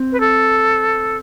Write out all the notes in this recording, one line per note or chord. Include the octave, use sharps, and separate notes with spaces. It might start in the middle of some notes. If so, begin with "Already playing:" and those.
Already playing: C4
B4
A4